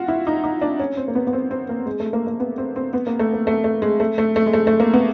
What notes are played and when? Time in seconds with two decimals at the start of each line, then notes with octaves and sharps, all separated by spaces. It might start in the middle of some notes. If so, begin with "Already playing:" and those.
Already playing: F4 F#4
0.08 E4
0.27 D#4
0.44 D#4
0.61 D4
0.79 C#4
0.97 C4
1.08 A#3
1.15 B3
1.27 B3
1.33 C4
1.51 C4
1.69 A#3
1.86 G#3
2.00 A3
2.13 A#3
2.27 A#3
2.40 B3
2.58 C4
2.76 C4
2.93 B3
3.07 A#3
3.19 A3
3.33 A#3
3.47 A3
3.64 A3
3.82 G#3
4.00 A3
4.18 A3
4.36 A3
4.46 G#3
4.53 A3
4.67 A3
4.80 A#3
4.93 B3